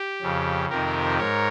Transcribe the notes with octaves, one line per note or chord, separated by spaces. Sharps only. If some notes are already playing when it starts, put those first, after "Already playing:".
Already playing: G4
F2 C#3
F2 C3 D#3 G4 A#4
G#2 A#4 C#5